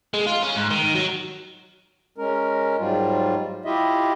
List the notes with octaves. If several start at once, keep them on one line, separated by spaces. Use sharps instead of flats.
G#3
F4
C#4
G#2
D#3
F#3
G#3 C#4 A#4
G#2 F#3 G3 F4
E4 F4 G4 D#5 E5